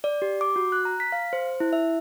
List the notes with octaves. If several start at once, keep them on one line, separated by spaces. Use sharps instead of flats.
D5
G4
D6
F#4
F#6
A#5
B6
F5
C5
E4
E5